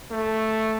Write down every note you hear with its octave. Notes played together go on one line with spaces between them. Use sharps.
A3